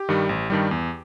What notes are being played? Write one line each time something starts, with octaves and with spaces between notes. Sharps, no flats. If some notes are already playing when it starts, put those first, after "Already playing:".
Already playing: G4
G2 D#3 G3
A1
G2 D#3 G3
E2